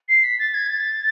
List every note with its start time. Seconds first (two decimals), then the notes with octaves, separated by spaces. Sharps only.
0.08 C7
0.23 B6
0.39 A6
0.54 G#6
0.69 A6